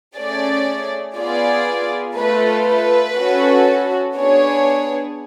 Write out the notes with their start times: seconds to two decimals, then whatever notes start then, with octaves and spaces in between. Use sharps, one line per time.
0.17 A3 C#4 G#4 D5
1.17 B3 F4 G#4 D5
2.17 A3 F4 A4 B4
2.67 B4
3.17 C#4 F#4 A4
4.16 B3 D4 G#4 C#5